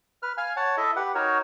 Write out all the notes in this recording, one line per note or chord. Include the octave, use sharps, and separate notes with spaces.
B4 F6
F5 G#5 F6
C#5 F#5 A5
E4 A4 D#5 E5
G4 B4 F#5
D#4 F#4 A#4 C#5